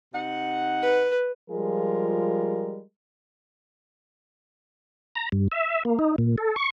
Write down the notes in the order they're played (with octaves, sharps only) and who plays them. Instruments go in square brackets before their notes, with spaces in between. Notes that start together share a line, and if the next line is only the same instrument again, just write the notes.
[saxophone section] C3 D#4 F#5
[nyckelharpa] B4
[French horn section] F3 G3 G#3 F4 G#4 A#4
[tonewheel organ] A#5
G2
E5
A#3
D#4
A#2
A4
C#6